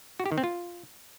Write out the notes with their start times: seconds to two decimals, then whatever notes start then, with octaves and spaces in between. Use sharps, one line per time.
0.20 F#4
0.26 G4
0.32 D#3
0.38 C4
0.44 F4